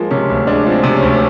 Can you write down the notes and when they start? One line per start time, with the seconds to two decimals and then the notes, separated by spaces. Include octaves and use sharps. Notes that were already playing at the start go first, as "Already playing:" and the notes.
Already playing: F3 G#3 A#3
0.11 C3 C#4
0.30 D2
0.47 G#3 D4
0.66 F3
0.72 C4
0.84 C3
0.97 C#4
1.02 D2